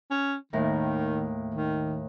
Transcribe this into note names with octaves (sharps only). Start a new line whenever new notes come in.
C#4
D#2 A2 D#3 A#4
D#3